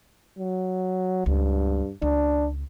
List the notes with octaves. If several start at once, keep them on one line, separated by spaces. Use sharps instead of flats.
F#3
C#2 G2
C#2 D4